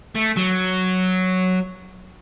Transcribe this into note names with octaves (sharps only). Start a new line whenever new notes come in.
A3
F#3